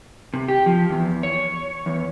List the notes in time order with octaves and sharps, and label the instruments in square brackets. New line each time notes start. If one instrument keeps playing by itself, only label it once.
[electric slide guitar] C3
G4
F3
E2
C#5
E2